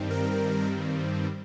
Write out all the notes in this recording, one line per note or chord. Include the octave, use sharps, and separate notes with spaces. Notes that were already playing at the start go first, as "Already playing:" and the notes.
Already playing: G2 D#3 G3 C4
A#4